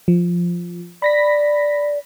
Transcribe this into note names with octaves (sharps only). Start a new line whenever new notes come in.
F3
D5 B5 A#6 B6